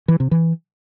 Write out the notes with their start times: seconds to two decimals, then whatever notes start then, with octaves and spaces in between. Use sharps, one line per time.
0.08 E3
0.20 C3
0.31 E3